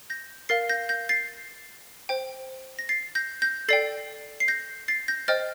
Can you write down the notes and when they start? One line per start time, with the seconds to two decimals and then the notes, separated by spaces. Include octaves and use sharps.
0.10 G6 A#6
0.49 A#4 F5 A6 C7
0.69 G6 A#6
0.89 G6 A#6
1.09 A6 C7
2.09 C5 G5
2.79 A#6
2.89 A6 C7
3.15 G6 A#6
3.42 G6 A#6
3.68 A4 D5 G5 A6 C7
4.40 C7
4.48 G6 A#6
4.88 A6 C7
5.08 G6 A#6
5.28 C5 D#5 G5 F6 A6